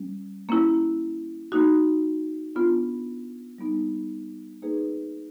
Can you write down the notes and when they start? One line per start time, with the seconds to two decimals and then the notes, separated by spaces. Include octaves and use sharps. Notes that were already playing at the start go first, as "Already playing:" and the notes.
Already playing: G3 C#4
0.49 A#3 C#4 E4
1.52 A#3 D#4 F#4
2.55 B3 D4 F4
3.58 G3 B3 D#4
4.62 A#3 D#4 G#4 B4